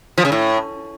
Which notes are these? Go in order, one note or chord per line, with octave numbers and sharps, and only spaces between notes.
F3
C#3
A2